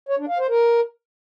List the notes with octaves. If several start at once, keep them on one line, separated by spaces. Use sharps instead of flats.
C#5
D4
F5
C5
A#4